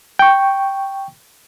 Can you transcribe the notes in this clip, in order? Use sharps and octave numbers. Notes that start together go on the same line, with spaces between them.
G5 C#6